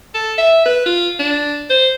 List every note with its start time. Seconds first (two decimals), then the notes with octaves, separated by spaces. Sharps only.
0.15 A4
0.38 E5
0.66 B4
0.86 F4
1.19 D4
1.70 C5